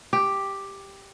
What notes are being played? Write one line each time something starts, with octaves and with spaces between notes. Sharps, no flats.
G4